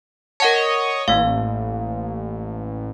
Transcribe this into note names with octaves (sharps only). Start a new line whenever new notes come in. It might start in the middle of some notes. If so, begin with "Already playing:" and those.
A#4 C#5 D#5 F#5 A5
A1 A#3 F5